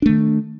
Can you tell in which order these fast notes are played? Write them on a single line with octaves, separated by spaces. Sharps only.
D4 A3 D#3